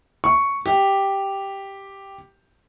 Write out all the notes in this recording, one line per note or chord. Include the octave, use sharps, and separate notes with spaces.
C#6
G4